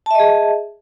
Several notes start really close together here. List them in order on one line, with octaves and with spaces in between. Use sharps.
A5 E5 D#5 G#4